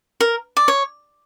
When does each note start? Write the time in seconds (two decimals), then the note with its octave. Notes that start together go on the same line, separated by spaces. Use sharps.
0.20 A#4
0.57 D5
0.68 C#5